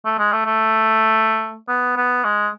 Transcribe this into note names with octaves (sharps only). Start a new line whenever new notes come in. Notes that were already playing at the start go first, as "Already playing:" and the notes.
A3
G#3
A3
A3
B3
B3
G#3